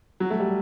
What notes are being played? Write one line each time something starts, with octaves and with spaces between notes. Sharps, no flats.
F#3
A3
G3